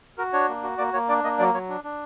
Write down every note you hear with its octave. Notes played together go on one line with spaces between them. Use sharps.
F#4 A#4
D4 C#5
A#3
F#4
A#3 D5
A#3 C#5
D4 D5
A#3 D#5
F#3 D5
F#3 C#5
D4
D4